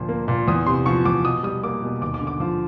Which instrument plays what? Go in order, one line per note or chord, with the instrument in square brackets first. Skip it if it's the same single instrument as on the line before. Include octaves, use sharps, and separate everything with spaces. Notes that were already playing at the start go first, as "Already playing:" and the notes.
Already playing: [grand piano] D2 A#2 F3
A#3
A#2
E2 D#6
C3 C6
F3 C#6
E2 D6
B2 D#6
G3 D#6
A#3 D6
B2
D#2 D6
D6
D3
D6
F3